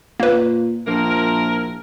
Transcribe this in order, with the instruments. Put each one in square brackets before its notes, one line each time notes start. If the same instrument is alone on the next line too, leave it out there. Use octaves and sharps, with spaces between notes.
[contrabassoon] A#2 [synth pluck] A#3 B4
[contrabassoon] A#1 [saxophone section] F3 E4 A#4